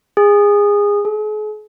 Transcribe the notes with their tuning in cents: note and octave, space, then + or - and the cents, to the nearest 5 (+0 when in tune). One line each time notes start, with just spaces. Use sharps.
G#4 -20
G#4 +40